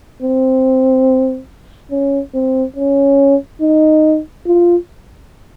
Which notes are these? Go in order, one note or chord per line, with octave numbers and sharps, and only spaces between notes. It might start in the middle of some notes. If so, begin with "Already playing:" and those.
C4
C#4
C4
C#4
D#4
F4